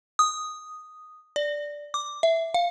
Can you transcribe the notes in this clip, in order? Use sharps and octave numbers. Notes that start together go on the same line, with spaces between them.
D#6
D5
D6
E5
F5